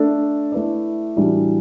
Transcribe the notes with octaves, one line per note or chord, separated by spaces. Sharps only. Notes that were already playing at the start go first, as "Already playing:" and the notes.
Already playing: A3 D4 A4
A3 E4 B4 D5
A2 E3 G3 D4 F#4